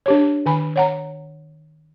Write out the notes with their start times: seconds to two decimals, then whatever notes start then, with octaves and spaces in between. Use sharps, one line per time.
0.06 D4 G4 C#5
0.46 D#3 G#5 B5
0.76 C#5 F#5 A#5